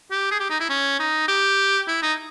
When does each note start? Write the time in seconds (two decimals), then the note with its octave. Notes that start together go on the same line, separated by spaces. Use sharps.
0.11 G4
0.31 G#4
0.40 G4
0.50 D#4
0.60 E4
0.69 C#4
0.99 D#4
1.28 G4
1.88 E4
2.02 D#4